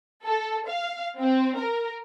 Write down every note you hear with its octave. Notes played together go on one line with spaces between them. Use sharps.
A4
F5
C4
A#4